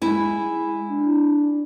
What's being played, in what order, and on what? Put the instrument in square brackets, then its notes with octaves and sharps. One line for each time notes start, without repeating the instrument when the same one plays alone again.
[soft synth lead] G#3 [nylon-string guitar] E4 G#5
[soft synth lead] D4